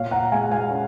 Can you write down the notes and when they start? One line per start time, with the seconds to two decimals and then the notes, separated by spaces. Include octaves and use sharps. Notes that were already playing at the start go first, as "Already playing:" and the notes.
Already playing: A#2 C#5 F5
0.11 F#5 A#5
0.32 G#3 F5 G#5
0.51 F5 G#5
0.71 C#4